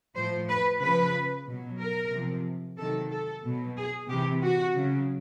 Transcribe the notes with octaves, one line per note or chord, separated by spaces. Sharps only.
A2 F3 C5
B4
C#3 F3 B4
B2 F#3
A#4
C3 F3
C3 D#3 F#3 A4
A4
B2 F#3
G#4
C3 E3 G4
F#4
C#3 F#3